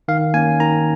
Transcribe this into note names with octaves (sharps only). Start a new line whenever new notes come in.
D#3 F5
A#3 C#4 G#5
D#3 A#5